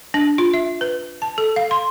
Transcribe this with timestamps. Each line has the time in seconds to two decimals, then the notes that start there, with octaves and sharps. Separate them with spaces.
0.14 D4
0.38 F4
0.54 E5
0.81 B4
1.22 A5
1.38 A4
1.56 F5
1.71 C6